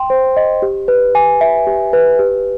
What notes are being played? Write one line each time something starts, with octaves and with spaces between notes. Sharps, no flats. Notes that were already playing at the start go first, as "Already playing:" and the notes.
Already playing: G5 C6
C5
D#5
G4
B4
G#5
E5
G4
B4
G4